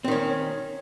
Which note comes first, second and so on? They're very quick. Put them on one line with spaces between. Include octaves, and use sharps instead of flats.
C4 D#3 C#4